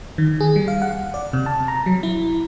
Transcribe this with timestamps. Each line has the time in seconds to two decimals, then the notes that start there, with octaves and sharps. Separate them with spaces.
0.18 D#3
0.41 G#4
0.56 G3
0.68 F5
0.82 F#5
1.14 D5
1.33 C3
1.46 A5
1.68 A#5
1.86 F#3
2.03 E4